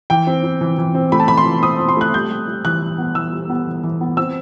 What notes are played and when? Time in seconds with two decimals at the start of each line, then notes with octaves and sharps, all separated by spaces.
0.10 E3 G5
0.27 C4
0.44 C4
0.61 E3
0.78 E3
0.95 C4
1.12 A3 B5
1.20 A5
1.28 E3 B5
1.37 C6
1.46 E3
1.62 C4 D#6
1.80 C4
1.89 C6
1.97 A3 F#6
2.14 G3 G6
2.30 G3
2.48 G3
2.65 E3 F#6
2.82 E3
2.98 B3
3.15 E3 E6
3.33 G3
3.50 B3
3.67 E3
3.83 E3
4.01 B3
4.17 C4 E6